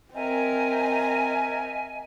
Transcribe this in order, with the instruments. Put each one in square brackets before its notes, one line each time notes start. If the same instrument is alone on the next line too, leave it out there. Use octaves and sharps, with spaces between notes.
[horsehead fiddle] C4 A#4 [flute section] D#5 E5 G#5